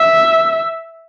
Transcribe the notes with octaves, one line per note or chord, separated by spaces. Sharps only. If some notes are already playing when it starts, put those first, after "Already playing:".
Already playing: E5